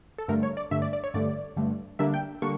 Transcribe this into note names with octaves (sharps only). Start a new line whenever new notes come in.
A4
G2 D3 A3 A#4
C#5
D5
G2 D3 A3 E5
D5
D5
C#5
G2 D3 A3 D5
G2 D3 A3
D3 G3 A#3 D4 E5
G5
D3 G3 A#3 D4 C#6